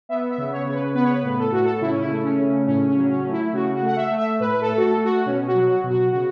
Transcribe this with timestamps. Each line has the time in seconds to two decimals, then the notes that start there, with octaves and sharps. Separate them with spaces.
0.09 B3 E5
0.30 E5
0.38 C#3
0.52 C#5
0.66 C#3 C#5
0.74 B4
0.95 B3 B4
1.04 C#5
1.12 B4
1.23 A2
1.39 A4
1.52 A2 F#4
1.65 A4
1.81 C#3 E4
1.91 C#4
2.00 E4
2.10 A3
2.24 C#4
2.39 C#3
2.67 A2 C#4
2.89 C#4
2.96 F#3
3.11 C#4
3.26 A3
3.32 E4
3.53 C#3 F#4
3.75 F#4
3.82 A3 F#5
3.96 E5
4.11 A3
4.18 E5
4.40 A2 B4
4.61 A4
4.68 A3
4.78 F#4
4.83 A4
4.97 A3
5.05 F#4
5.26 B2 C#4
5.48 F#4
5.55 F#3
5.69 F#4
5.84 B2
5.90 F#4
6.12 C#3 F#4